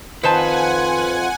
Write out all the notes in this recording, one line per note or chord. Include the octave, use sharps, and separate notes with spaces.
F2 D#3 F4 B4 C5 F#5 G#5 A5